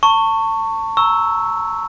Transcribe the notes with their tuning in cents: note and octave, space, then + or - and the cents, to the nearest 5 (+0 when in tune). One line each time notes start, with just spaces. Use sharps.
A5 +30 C#6 +0
A#5 +0 C#6 +0 E6 -5